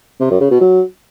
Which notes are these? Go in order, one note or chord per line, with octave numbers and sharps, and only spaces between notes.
C3
F#2
C#3
B2
F#3